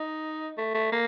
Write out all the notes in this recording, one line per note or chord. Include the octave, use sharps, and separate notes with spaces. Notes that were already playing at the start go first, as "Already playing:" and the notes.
Already playing: D#4
A3
A3
A#3